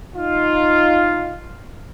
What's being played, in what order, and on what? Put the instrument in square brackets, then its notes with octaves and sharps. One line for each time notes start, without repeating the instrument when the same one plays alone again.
[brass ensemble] D#4 F4